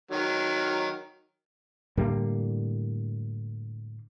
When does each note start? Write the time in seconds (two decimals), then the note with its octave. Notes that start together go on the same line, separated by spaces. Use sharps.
0.11 D#3 F#3
1.97 A2 D3 G3 A#3